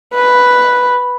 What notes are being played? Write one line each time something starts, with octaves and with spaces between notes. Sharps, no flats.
B4